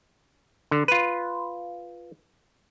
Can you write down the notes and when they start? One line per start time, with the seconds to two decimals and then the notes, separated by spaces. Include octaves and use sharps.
0.71 D3
0.88 F4 B4